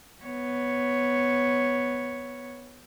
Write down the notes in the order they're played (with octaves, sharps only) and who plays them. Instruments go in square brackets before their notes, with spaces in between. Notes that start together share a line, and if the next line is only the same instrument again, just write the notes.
[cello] B3 C#5